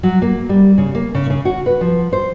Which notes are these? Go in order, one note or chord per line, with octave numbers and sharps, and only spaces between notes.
F#3
A#3
G3
C#3
A#3
C#3
C#3
F#4
B4
F3
C5